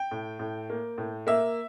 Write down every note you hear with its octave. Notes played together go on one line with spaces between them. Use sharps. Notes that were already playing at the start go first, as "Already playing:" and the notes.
Already playing: G5
A2
A2
A#3
A2
A#3 E5